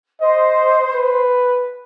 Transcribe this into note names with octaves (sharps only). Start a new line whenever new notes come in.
C5 D#5
B4